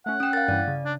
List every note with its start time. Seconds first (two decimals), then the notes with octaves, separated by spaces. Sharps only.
0.06 A3 C#4 F#5
0.20 C#4 G5 D#6 E6
0.33 A#4 F5 A6
0.48 G2 E3 D5
0.68 C#3
0.85 D4